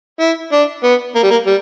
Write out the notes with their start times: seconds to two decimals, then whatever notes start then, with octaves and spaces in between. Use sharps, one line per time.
0.20 E4
0.52 D4
0.84 B3
1.15 A#3
1.23 G3
1.31 A#3
1.46 G3